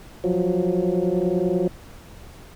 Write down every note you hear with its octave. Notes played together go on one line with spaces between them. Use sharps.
F3 F#3